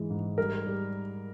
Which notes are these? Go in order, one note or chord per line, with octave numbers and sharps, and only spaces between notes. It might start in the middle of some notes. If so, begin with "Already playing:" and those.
Already playing: G#2 E3 G#3
G#2
G3 A#4
G3